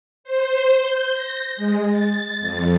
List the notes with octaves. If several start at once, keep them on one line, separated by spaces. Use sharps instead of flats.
C5
G6
A#6
G#3
A6
F2